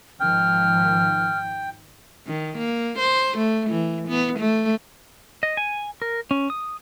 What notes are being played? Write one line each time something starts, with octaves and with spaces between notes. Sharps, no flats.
G#1 D#3 F3 G5 F6
D#3
A#3
C5
A3
E3
B3
A3
D#5
G#5
A#4
C#4
D#6